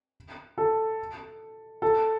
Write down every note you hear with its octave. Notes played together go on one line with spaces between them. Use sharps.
A4
A4